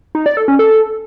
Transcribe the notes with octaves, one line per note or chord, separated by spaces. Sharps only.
D#4
D5
A4
C#4
A4